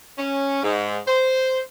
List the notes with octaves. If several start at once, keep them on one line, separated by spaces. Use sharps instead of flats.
C#4
G#2
C5